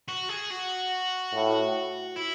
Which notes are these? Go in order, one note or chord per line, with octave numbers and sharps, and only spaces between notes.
F#4
G#4
F#4
A2
E4